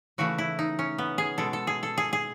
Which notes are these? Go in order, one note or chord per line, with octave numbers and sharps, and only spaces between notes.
C#3 E3 A3 F#4
E4
D#4
C#4
B3
G#4
B2 G#3 A4
A4
G#4
A4
G#4
G#4